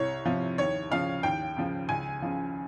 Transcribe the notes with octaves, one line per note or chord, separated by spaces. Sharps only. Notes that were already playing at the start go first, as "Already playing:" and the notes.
Already playing: C2 C#5
C3 F3
D#2 C#5
C#3 F3 F5
D#2 G5
C#3 F3
C#2 G#5
C#3 F3